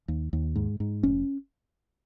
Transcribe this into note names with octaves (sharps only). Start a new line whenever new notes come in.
D#2
D#2
G#2
G#2
F1 C#4